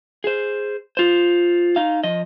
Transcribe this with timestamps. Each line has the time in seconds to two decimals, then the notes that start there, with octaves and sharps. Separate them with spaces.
0.24 G#4 C5
0.97 F4 C5
1.76 D#4 F5
2.04 F3 D#5